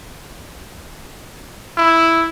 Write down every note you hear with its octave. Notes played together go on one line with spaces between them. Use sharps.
E4